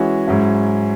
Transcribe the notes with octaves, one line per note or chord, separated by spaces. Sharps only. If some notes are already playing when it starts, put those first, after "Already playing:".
Already playing: E3 G#3 C#4 F#4
G#2 F#3 C#4 E4